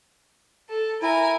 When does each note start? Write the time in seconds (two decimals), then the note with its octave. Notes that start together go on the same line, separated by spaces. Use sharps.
0.70 A4
1.02 E4 A#4 G#5